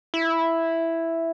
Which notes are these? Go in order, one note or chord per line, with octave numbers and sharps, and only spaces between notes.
E4